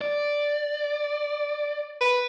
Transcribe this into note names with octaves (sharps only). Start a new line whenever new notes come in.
D5
B4